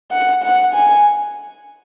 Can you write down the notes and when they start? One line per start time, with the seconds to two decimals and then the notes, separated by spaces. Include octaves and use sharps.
0.12 F#5
0.43 F#5
0.74 G#5